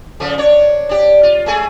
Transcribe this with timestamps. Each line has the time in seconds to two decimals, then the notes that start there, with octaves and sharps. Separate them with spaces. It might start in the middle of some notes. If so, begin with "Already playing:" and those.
0.20 C#3 F3 A3
0.38 D4 C#5
0.89 D4 G4
1.23 F4
1.46 G#3 A3 G#4